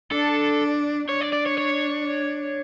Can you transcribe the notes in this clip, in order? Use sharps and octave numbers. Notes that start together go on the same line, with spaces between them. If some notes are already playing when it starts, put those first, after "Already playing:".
D4 A4
D4 C#5
D5
D5
C#5
C#5